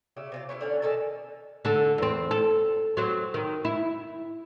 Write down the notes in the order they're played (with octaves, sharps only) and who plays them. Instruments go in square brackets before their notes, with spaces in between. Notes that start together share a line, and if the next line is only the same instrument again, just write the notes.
[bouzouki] C#3 E4 G4
C3 F4 G4
C#4 E4 F4 G4
D3 C#4 D4
D#3 A4 G#5 A5
[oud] D3 A4
E2 C4
A4
F#3 C4
D#3
E4